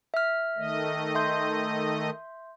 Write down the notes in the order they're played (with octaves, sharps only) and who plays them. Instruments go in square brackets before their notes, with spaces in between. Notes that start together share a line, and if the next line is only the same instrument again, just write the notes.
[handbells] E5 F6
[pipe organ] D#3 A3 D#5
[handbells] E5 C6 G6